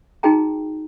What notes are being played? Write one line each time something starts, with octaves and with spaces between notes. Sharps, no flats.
D#4 F#4 G#4 G5 A#5